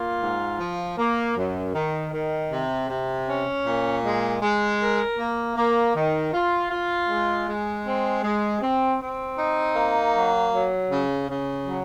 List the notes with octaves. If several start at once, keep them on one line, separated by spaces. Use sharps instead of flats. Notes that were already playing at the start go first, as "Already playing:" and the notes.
Already playing: A#3 F4
G#2
F3
A#3
F#2
D#3
D#3
C3
C3
C#4
A#2
G#3
G#3
A#4
A#3
A#3
D#3
F4
F4
G#3
G#3
C4
G#3
C4
C4
D#4
A#3
F#3
F#3
C#3
C#3
F#3